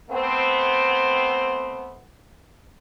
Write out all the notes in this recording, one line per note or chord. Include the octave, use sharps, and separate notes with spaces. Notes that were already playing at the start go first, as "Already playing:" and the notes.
A3 B3 C4